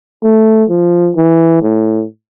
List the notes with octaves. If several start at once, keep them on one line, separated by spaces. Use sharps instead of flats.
A3
F3
E3
A2